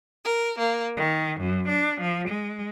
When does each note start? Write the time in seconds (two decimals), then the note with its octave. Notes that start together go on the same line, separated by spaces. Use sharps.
0.24 A#4
0.59 A#3
0.96 D#3
1.40 F#2
1.68 D4
2.00 F3
2.29 G#3